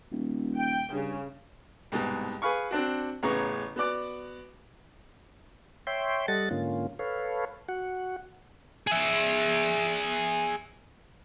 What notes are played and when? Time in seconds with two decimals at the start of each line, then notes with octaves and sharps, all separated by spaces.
0.12 D#1
0.57 G5
0.92 G2 C#3
1.92 C2 G#2 B2
2.42 G#4 B4 F5 C#6
2.71 C4 D4 F#4
3.23 A1 C#3 B3 A#5 C#6
3.76 B3 F#4 D5 D6
5.87 C#5 E5 G5 C6
6.28 G3 A4 D#5 F#5 A6
6.51 G#2 D3 A#3 C#4 F4
6.99 A4 B4 C#5 F5
7.69 F#4 F#5
8.87 G#4 E5